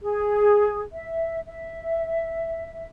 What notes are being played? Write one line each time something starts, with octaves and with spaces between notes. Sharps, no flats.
G#4
E5
E5